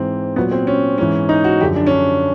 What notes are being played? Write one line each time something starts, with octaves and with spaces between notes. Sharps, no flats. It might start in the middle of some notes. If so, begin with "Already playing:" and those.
Already playing: G#2 E3 C4
A#2 F#3 B3
C4
C#4
G#2 E3 C#4
D#4
F#4
F#2 D3 F3 G4
D4
C#4
D4